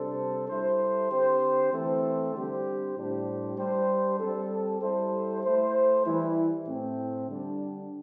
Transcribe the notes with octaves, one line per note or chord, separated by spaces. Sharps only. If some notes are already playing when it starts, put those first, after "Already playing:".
Already playing: C3 G3 D4 A4 C5
G3 E4 A4 C5
D3 C4 G4 C5
E3 A3 C4 A4 C5
D3 G3 C4 G4 C5
A2 G3 D4 G4 C5
G3 D4 G4 C5
G3 C4 A4
G3 E4 A4 C5
A3 E4 C5
E3 G3 E4
A2 A3 C4
D3 G3 D4